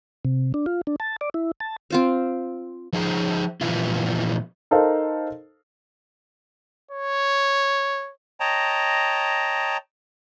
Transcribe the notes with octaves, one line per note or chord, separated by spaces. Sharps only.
C3
D4
F4
D4
A5
D5
E4
A5
C4 F4 C5
F3 D#4 G#4 C5
A#2 E3 F3 B3 E4 F4
D#4 A4 A#4 C5 F5
C#5
C#5 D#5 G5 A5 A#5